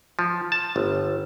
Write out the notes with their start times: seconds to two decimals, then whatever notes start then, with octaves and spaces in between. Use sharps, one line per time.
0.19 F3
0.52 A5
0.76 G1